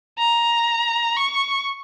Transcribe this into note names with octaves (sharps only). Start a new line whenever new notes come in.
A#5
C#6